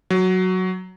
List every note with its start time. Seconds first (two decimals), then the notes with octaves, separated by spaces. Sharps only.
0.10 F#3